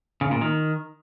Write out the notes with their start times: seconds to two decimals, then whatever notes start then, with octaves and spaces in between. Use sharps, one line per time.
0.21 C#3
0.31 A#2
0.41 D#3